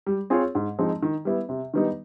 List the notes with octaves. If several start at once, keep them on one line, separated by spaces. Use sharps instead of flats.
G3
C4 F4 G#4 C#5
G#2
F3 G#3 C4 D#4
D#3
G3 B3 E4
C3
D#3 G3 B3 D#4